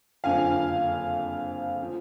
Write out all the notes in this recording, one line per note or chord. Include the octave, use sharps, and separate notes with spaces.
F#1 F2 D3 F3 F5 G#5
F3